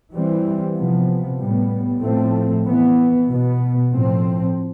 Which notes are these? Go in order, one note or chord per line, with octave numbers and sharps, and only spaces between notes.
E3 G3 C4
C3 F3 B3
A2 G3 B3
A2 F3 A3 C4
E3 B3
B2 B3
A2 F3 C4